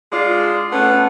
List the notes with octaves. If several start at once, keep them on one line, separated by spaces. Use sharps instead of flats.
G#3 D4 F4
A3 B3 C#4 F#5